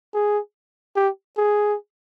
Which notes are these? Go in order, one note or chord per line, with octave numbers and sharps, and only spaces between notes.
G#4
G4
G#4